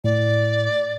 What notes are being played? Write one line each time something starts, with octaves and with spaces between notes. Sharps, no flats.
A2 D5